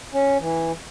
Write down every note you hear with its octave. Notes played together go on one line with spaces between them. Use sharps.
C#4
E3